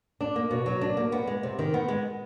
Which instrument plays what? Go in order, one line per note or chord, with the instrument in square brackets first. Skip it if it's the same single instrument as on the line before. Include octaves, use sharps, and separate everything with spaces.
[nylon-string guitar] D4
A#3
B2
F#3
D4
A#3
B3
G#3
C3
D#3
B3
G#3